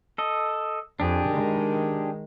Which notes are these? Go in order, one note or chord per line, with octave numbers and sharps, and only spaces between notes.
A4 D#5
F2 D4 G4 G#4
D#3 G#3